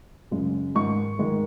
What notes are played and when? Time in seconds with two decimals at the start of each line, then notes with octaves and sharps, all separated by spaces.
0.31 F#2 C#3 G#3
0.75 G#2 D#3 G#3 C#6
1.19 G#2 D#3 G#3